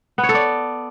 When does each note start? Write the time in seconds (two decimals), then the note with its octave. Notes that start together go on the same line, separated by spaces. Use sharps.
0.18 B3
0.23 C#5
0.29 A4
0.34 D5